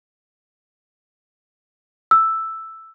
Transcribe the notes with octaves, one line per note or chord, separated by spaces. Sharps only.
E6